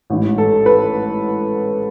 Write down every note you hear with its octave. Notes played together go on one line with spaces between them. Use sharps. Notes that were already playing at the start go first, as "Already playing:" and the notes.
A1 G#2 E3
A4
B4